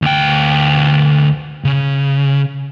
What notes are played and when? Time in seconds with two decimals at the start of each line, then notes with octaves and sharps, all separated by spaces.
0.02 D2 G5
1.65 C#3